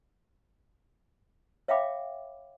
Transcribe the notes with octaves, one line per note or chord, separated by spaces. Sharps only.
C#5 E5 F5 G5 B5 D6